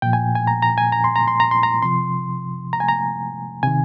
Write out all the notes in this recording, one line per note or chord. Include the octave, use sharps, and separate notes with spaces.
A#2 F3 G5
G#5
G#5
A#5
A#5
G#5
A#5
C6
A#5
C6
A#5
C6
A#5
C3 F3 C6
A#5
G#5
A#5
C3 D#3 G#5